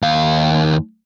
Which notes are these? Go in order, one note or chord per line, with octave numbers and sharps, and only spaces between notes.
D#2 F5